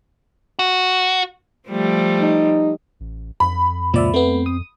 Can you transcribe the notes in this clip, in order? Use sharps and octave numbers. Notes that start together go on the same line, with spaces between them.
F#4
F3 G3 A3
D#4
A1
F2 B5
C#2 A#2 F3 D5 E5
A3 B3 C4
D#6